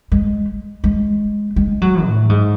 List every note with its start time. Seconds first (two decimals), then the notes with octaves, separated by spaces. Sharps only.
0.12 G#3
0.84 G#3
1.56 G#3
1.81 F#3
2.06 A2
2.29 G#2